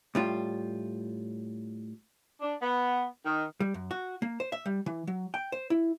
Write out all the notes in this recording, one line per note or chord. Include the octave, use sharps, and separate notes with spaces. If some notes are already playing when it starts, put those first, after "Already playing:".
A2 G3 F4
D4
B3
D#3
G3
F#2
F#4
A#3
C5
E5
G3
E3
F#3
G5
C5
E4